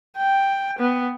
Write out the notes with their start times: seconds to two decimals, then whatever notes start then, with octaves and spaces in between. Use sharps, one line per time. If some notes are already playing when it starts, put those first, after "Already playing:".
0.17 G5
0.79 B3